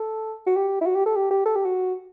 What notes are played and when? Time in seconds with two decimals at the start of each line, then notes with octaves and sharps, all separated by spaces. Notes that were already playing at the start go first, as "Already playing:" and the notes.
Already playing: A4
0.47 F#4
0.56 G4
0.81 E4
0.86 F#4
0.96 G4
1.06 A4
1.16 G4
1.31 G4
1.45 A4
1.56 G4
1.66 F#4